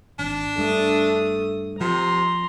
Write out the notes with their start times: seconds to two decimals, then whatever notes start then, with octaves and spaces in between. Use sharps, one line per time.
0.19 G#1 D4
0.58 G2 A3 D#6
1.80 C3 F3 A#5 C6